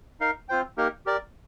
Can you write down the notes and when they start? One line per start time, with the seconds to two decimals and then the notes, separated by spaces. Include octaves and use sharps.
0.20 D#4 A#4 F5
0.49 C4 F4 C5 G5
0.77 A#3 D#4 G4 A#4
1.06 G4 A#4 D5